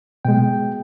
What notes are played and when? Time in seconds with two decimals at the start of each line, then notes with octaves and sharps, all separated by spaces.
0.25 B2 G#3 G5